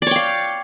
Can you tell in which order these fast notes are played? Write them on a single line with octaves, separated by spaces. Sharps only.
D5 C#5 G5 F5